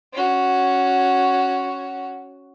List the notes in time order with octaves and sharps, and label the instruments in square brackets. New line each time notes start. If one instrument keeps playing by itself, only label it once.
[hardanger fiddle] C#4 F#4